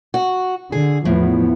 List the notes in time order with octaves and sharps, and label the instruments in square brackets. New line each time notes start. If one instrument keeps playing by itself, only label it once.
[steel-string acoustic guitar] F#4
[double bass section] D3 [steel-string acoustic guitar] G#4
[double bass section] E2 F3 B3 [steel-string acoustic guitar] A2